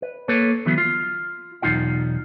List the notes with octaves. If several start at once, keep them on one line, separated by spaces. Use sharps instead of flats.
B4
A#3 A4 B4 C#5
D3 E3 F#3 B3
F4
B1 E2 E3 D#4 F4 F#5